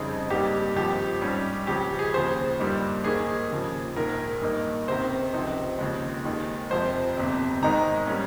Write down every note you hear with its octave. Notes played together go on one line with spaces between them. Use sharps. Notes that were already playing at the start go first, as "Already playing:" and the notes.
Already playing: F2 C#3 G3 C4 D#4 G#4
G2 G3 A#3 D#4 G4
G#1 G2 F3 G4
G#2 G3 C#4
C#2 C#3 F3 G4
G#4
D#2 C#3 F3 C5
G2 G3 A#3 D#4
G#2 D#3 A#3 D#4 G#4
D#2 C#3 F3
A#1 G#2 D#3 A#4
G2 D#3 A#3 D#4
C#2 C3 D#3 C5
C#2 C3 F3 C4 D#4
D#2 C#3 F3 G#3
D#2 D#3 G#3
F2 C3 F3 G#3 C5
G1 F2 C3
G#1 G#2 D#3 G#3 D#4 A#5
G3 A#3 C#4